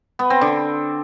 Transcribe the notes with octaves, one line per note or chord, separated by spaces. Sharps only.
B3
C4
D3